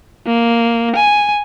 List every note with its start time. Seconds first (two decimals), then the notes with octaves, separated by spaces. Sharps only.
0.26 A#3
0.96 G#5